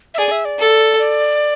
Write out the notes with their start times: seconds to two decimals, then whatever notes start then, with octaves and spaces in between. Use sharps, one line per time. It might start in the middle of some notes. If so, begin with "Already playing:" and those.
0.14 E5
0.18 G#4 D5
0.31 E5
0.45 D5
0.59 A4
0.99 D5